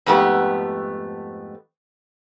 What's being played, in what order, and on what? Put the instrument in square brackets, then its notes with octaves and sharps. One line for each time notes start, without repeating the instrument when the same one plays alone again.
[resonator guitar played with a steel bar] F2 G#2 A3 B3 G4